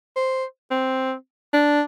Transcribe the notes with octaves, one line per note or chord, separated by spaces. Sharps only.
C5
C4
D4